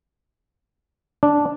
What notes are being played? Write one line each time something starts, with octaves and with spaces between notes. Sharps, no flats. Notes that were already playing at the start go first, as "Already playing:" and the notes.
D4